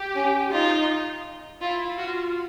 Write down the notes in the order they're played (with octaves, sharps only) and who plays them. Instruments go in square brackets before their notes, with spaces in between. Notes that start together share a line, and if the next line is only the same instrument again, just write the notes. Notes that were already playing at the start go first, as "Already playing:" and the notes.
Already playing: [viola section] G4
[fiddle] C#4
[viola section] D#4 [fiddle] F4
[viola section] E4 [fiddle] F4
[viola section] F4 [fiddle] F#4